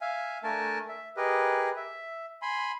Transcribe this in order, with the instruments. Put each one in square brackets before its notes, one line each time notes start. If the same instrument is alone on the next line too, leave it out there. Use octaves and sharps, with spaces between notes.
[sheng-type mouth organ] E5 F5 G#5
A3 D4 A#4 G#5 A5
E5
G4 G#4 A#4 B4 D#5
E5
G#5 B5 C6